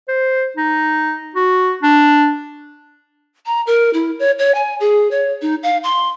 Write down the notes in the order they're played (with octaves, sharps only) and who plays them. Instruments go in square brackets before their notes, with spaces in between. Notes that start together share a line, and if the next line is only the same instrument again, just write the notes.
[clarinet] C5
D#4
F#4
D4
[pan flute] A#5
A#4
E4
C#5
C#5
G#5
G#4
C#5
D#4
F5
C6